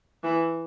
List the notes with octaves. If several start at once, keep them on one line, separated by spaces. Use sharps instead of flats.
E3